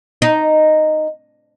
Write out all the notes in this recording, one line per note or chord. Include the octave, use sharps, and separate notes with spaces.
D#4